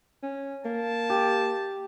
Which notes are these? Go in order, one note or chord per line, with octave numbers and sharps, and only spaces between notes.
C#4
A#3 A5
G4